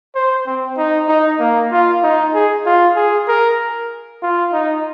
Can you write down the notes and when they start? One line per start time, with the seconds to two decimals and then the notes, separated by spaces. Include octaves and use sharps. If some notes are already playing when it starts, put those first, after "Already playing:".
0.15 C5
0.46 C4
0.77 D#4
1.08 D#4
1.39 A#3
1.71 F4
2.03 D#4
2.34 G#4
2.65 F4
2.96 G#4
3.28 A#4
4.22 F4
4.53 D#4